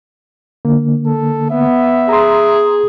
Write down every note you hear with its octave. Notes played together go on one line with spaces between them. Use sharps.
D3 A#3
A4
B3 E5
G#4 A#5 C6